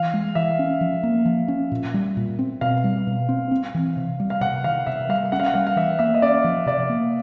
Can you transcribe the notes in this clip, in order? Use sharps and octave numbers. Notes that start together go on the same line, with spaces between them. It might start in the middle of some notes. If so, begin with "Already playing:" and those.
Already playing: E3 F5
G#3
E3 E5
C#4
F3
A#3
F3
C#4
A#2
G3
A#2
C4
B2 F5
G3
B2
C4
C4
E3
C3
G3
F5
C3 F#5
D#3 F5
C3 E5
G3 F5
C#4 F#5
F5
F#5
G3 F5
F5
E3 E5
A#3 E5
D#5
C#4 D5
F3
C3 D5
A#3